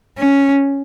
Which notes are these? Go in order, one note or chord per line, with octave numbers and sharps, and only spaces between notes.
C#4